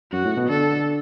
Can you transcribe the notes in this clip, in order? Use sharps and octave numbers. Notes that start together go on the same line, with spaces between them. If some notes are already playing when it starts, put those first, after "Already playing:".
F#2 F#4
A2
B2
D3 A4